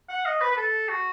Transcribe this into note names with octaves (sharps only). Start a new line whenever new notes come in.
F#5
D#5
B4
B4
A4
F#4